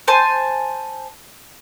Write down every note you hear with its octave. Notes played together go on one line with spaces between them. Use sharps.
C5 G#5 A5